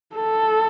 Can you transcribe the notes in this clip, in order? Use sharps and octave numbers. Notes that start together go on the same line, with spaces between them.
A4